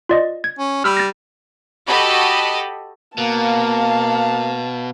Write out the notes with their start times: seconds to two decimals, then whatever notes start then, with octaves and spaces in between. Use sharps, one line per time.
0.09 F4 D5 D#5
0.44 G#6
0.59 C#4
0.84 G3 B5 E6 F6
0.97 A6 A#6
1.87 F#4 G4 A4 D#5 B5
3.18 B2 A#3 F5 A5